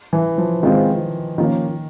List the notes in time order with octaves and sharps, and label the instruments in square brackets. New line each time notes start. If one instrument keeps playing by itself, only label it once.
[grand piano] E3
F3
[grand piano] D#3 [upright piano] F3 G#3 C4 F4
[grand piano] D#3 [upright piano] F3 A#3 C#4